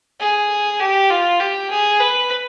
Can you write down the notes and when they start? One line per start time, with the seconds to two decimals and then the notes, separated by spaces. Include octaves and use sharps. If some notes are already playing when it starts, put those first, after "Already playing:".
0.20 G#4
0.80 G4
1.10 F4
1.40 G4
1.70 G#4
2.00 B4